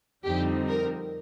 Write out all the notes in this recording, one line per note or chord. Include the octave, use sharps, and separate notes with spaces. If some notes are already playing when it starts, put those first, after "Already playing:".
F2 D3 G3 C4 D#4 G4
A#4